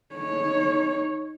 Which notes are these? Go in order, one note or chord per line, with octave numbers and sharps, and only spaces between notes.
D#4 C#5